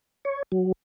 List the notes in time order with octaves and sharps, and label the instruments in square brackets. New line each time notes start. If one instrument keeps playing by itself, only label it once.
[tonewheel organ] C#5
F#3